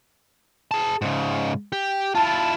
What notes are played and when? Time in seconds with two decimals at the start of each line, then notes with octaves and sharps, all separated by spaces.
0.71 G#4 A5
1.02 G#2 C#3
1.72 G4
2.15 E4 F4 A5